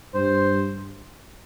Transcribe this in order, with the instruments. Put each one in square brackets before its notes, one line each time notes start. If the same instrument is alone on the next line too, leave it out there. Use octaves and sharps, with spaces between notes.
[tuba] G2 [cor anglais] C5